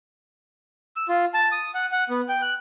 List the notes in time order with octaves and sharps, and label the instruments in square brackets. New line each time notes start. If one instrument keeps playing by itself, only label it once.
[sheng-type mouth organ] E6
F4
A5
D#6
F#5
F#5
B3
G5
F#6